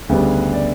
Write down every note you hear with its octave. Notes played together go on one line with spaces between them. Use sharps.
D2 C#3 G3 B3 D4
D5